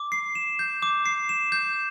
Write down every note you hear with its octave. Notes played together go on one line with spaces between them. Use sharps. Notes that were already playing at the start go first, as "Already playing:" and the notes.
Already playing: D6
C7
E7
G6
D6
C7
E7
G6